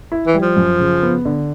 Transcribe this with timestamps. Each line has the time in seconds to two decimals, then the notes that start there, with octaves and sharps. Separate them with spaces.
0.12 E4
0.26 E3
0.34 G3
0.42 F3
0.56 F#2
0.80 C#3
1.03 B3
1.25 D3